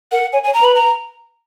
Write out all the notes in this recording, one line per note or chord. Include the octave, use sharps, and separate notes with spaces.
A#4 F#5
C#5 G#5
G#5
C#5
A#5
B4 B5
A#5